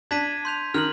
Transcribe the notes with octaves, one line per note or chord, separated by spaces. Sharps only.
D4 G#6 B6 D#7
C6 G6 F7
D#3 F6 F#6 F#7